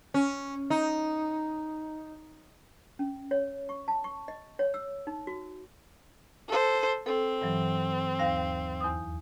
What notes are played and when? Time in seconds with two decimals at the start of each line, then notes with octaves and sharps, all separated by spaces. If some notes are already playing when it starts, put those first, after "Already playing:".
0.14 C#4
0.70 D#4
2.99 C#4
3.31 C#5
3.69 C#6
3.88 A5
4.04 C#6
4.28 D#5
4.59 C#5
4.74 E6
5.07 D#4
5.27 F#4
6.48 A4 C5
7.06 C4 A4
7.41 G2 E3 F#3
8.19 D#2 F5 A#6
8.81 E2 D#6